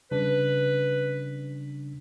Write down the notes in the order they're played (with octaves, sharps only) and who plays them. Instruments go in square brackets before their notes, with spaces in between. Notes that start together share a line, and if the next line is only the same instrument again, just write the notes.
[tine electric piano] C#3 G3 D4 [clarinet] B4